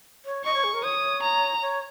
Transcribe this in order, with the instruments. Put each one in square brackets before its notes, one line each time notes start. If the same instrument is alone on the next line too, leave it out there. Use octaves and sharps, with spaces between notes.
[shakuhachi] C#5
[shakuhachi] D#5 [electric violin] C#6
[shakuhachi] C#5
G#4
A#4
[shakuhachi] C#5 [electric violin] D#6
[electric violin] A#5
[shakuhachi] C#5